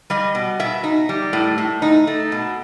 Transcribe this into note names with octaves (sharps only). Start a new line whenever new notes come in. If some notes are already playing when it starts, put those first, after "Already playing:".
G3 D#5
B2
B2 E5
D#4
G3
A2
A2
D#4
A3
B2